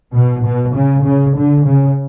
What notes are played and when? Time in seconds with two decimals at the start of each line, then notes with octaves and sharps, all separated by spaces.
0.14 B2
0.44 B2
0.75 C#3
1.05 C#3
1.36 D3
1.66 C#3